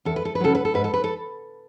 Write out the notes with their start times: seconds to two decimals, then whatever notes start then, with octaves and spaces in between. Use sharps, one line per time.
0.05 E2 A4
0.16 B4
0.25 A4
0.35 B4
0.40 C#3 F#3 A4
0.55 B4
0.65 A4
0.74 G#2 B4
0.84 A4
0.94 B4
1.04 A4